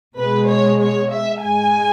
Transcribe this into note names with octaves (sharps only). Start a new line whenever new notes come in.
B2 G#3 B4
C#5
C#5
E5
G#2 G#3 G#5